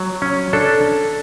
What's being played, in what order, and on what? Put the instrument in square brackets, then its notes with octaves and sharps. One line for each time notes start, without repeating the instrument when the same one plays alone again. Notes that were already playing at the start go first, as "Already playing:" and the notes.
Already playing: [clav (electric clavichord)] F#3
C#4
D4 A4